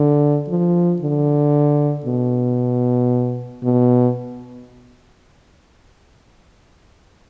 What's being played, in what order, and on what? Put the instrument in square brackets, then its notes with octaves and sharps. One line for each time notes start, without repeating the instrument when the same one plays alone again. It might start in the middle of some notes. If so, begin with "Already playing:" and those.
Already playing: [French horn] D3
F3
D3
B2
B2